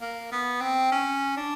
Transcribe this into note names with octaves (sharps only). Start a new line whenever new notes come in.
A#3
B3
C4
C#4
D4